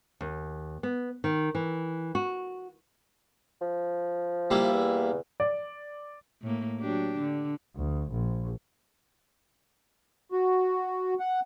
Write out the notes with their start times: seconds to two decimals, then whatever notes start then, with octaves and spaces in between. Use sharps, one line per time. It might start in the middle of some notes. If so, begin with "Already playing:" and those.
0.21 D#2
0.83 B3
1.24 D#3
1.55 E3
2.15 F#4
3.61 F3
4.51 G3 A#3 E4
4.74 E2
5.40 D5
6.42 A2 A#3
6.80 F#3 D4 G4
7.19 D3
7.76 D2
8.11 A#1
10.32 F#4
11.20 F#5